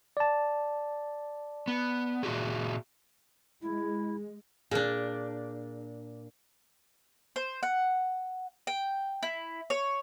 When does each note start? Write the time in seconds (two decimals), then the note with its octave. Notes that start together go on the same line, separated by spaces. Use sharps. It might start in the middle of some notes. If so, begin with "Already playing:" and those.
0.17 D5 A5
1.68 B3
2.23 A#2 F#4 G#4
3.62 G#3 E4
4.71 A#2 D4 G#4
7.36 C5
7.63 F#5
8.67 G5
9.23 E4
9.70 C#5